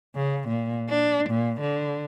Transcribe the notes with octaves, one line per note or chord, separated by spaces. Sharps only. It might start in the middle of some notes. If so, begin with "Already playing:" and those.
C#3
A#2
D4
A#2
D3